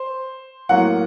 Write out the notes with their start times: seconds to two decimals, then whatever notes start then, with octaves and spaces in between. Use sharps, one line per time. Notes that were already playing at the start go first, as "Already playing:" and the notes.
Already playing: C5
0.69 A2 F#3 A#3 F#5